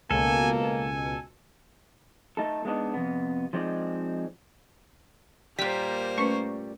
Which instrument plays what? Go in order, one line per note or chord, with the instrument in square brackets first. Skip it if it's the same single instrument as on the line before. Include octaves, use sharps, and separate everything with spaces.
[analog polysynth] C#2 B2 [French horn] A#3 [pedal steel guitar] A4 [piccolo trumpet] G#5
[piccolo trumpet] G#5
[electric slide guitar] A3 D#4 A4
G#3 A3 B3 D4 D#4
F2 C3 B3
F3 G#3 C4 D#4 D5
[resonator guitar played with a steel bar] A#2 G3 [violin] A#3 C5 [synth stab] B6
[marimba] A3 C#4 B4 [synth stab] C#6